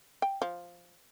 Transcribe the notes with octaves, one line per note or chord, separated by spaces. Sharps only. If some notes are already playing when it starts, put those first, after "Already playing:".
G5
F3